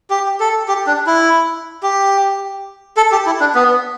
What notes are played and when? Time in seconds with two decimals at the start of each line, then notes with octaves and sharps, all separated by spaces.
0.10 G4
0.40 A4
0.68 G4
0.87 D4
1.07 E4
1.83 G4
2.97 A4
3.12 G4
3.26 E4
3.40 D4
3.55 B3